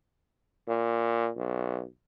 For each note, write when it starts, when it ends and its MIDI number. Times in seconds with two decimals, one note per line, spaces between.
0.68 1.30 46
1.37 1.83 35